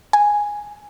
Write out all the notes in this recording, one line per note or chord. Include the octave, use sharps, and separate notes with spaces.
G#5